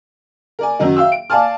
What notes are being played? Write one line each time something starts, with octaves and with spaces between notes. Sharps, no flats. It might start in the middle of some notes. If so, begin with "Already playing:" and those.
A#4 D5 G#5
F#2 D#3 F#3 D#4
E5 F5 G5 E6
D7
D5 F5 G#5 A5 F6